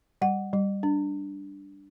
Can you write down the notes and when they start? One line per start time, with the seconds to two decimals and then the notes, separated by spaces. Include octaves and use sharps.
0.22 G3 F#5
0.53 G3
0.83 D4